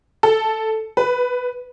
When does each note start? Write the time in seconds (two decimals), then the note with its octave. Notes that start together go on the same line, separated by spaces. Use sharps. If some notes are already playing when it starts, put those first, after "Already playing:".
0.23 A4
0.97 B4